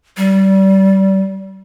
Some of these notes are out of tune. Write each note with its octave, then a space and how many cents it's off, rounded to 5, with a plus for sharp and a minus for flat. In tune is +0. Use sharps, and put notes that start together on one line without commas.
G3 -25